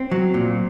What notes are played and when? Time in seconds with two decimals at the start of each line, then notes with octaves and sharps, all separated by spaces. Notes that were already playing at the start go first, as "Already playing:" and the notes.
Already playing: C4
0.11 F#3
0.34 A#2